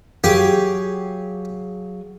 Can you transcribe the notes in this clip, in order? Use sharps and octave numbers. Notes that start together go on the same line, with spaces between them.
F#3 G4 G#4 F5